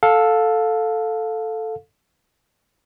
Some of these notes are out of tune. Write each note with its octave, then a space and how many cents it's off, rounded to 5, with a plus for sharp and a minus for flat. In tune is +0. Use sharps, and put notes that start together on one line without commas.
A4 +0 F5 +20